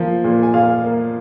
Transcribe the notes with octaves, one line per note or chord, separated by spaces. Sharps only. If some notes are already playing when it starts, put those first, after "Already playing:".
Already playing: F3 A#3
A#2
G#5
A#2 F5
A#3